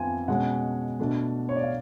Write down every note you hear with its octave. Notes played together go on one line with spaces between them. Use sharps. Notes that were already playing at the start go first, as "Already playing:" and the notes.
Already playing: F2 F3 B3 F4 G#5
B2 G#3 C#4 F#5
B2 A3 D4
C#5
D5
F5